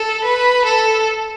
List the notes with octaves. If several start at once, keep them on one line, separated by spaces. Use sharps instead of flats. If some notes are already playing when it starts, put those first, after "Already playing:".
Already playing: A4
B4
A4